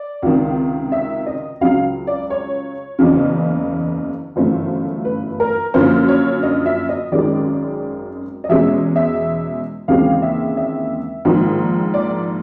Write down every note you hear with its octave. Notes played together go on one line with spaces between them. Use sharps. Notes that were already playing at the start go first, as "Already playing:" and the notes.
Already playing: D5
C#2 C3 D#3
E5
D#5
C#2 C#3 F#3 F5
D5
C#5
F#1 E2 C#3
G1 F#2 C#3 E3 A3 C5
B4
A#4
F#2 D3 F3 A#3 C#4 C5
C#5
D#5
E5
D#5
G#1 F#2 D#3 G#3 C#4 D5
D#5
E2 B2 G#3 C#4 E5
E5
D#2 C#3 E3 G#3 C4 F5
E5
E5
A#1 G#2 D#3
D5